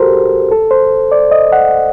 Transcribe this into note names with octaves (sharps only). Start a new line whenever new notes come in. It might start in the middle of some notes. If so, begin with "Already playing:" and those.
Already playing: F#4 G4 A4 A#4 C5
A4
C5
D5
D#5
F#5